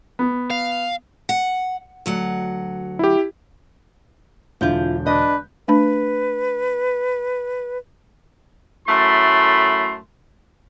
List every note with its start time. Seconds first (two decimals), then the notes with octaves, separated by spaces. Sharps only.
0.19 B3
0.51 F5
1.29 F#5
2.06 D2 F#3 F#5
2.99 E4 G4
4.61 E1 D3 E4 F4 G6
5.06 D4 B4 D#5
5.68 A3 D4 B4 B5
8.87 F#2 A2 A3 B5 C6